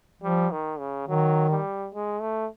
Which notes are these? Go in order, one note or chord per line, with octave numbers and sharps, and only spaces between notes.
F3 G3
D#3
C#3
D#3 F#3
G3
G#3
A3